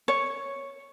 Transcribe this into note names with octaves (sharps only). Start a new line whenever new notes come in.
C#5